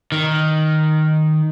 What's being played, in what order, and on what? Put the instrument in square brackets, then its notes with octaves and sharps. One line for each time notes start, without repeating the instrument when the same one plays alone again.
[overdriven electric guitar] D#3